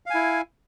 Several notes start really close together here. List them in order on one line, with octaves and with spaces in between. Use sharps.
F5 G#5 E4